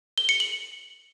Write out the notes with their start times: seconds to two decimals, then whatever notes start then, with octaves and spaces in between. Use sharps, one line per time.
0.18 G7
0.29 C#7
0.40 F#7